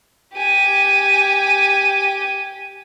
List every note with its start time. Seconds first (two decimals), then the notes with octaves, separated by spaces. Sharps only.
0.34 G4 G#5